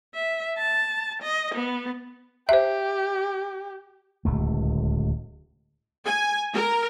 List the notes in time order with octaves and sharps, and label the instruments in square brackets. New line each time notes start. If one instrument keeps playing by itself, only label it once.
[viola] E5
A5
D#5
B3
[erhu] G4 [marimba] C5 E5
[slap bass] D1 C#2 A3
[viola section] G#5
A#4